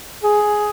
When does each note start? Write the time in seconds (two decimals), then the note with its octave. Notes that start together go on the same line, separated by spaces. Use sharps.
0.23 G#4